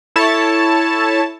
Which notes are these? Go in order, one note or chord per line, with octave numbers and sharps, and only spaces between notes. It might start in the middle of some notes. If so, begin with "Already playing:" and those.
E4 A4 C#5 A5